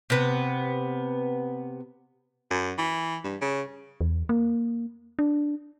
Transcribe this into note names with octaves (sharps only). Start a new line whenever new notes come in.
C3 B3
F#2
E3
G2
C#3
E2
A#3
D4